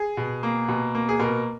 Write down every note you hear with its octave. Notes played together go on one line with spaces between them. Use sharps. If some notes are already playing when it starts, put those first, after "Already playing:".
Already playing: G#4
B2
A#3
B2
A#3
G#4
B2 A#4